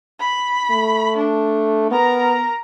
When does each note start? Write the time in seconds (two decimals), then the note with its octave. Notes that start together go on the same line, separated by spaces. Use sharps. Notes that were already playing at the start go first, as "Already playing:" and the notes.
0.19 B5
0.71 A3
1.17 D4
1.91 B3 A#4 A#5